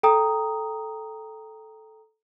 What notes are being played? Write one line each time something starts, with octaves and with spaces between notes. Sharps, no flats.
A4 G5 A#5 D#6